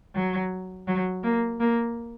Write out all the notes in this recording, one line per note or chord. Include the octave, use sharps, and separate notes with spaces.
F#3
F#3
A#3
A#3